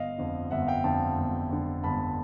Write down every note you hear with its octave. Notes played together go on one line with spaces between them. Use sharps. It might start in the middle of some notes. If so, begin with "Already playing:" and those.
Already playing: G1 D#5 F5
F2 D3
G1 E5 F#5
F5 G5
F2 D3 G5 A5
G1
F2 D3
G1 A5 B5